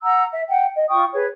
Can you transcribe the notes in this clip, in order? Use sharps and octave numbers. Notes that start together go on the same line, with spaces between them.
F#5 A#5 E6
E5
F#5 G5
D#5
F4 G5 C#6 D#6
G#4 B4 C#5